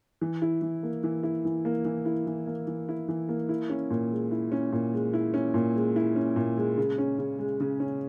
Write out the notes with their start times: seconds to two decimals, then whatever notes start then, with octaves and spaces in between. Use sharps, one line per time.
0.21 E3
0.42 E4
0.62 E3
0.83 A#3
1.04 E3
1.23 E4
1.45 E3
1.65 A#3
1.85 E3
2.06 E4
2.27 E3
2.47 A#3
2.67 E3
2.89 E4
3.09 E3
3.29 A#3
3.49 E4
3.69 C#4
3.91 A#2
4.12 G#3
4.31 E4
4.52 C#4
4.72 A#2
4.94 G#3
5.14 E4
5.34 C#4
5.54 A#2
5.76 G#3
5.96 E4
6.16 C#4
6.36 A#2
6.57 G#3
6.77 C#3
6.98 C#4
7.19 C#3
7.39 G#3
7.60 C#3
7.80 C#4